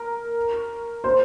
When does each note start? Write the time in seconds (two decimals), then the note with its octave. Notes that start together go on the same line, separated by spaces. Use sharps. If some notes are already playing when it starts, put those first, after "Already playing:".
Already playing: A#4
1.04 C5